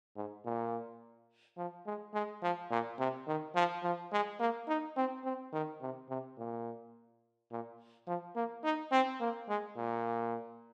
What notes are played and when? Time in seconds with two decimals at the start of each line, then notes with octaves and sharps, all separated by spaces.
0.16 G#2
0.45 A#2
1.57 F3
1.86 G#3
2.14 G#3
2.42 F3
2.70 A#2
2.99 C3
3.27 D#3
3.55 F3
3.83 F3
4.12 G#3
4.39 A#3
4.68 D#4
4.96 C4
5.24 C4
5.53 D#3
5.81 C3
6.09 C3
6.38 A#2
7.51 A#2
8.07 F3
8.35 A#3
8.64 D#4
8.92 C4
9.20 A#3
9.48 G#3
9.77 A#2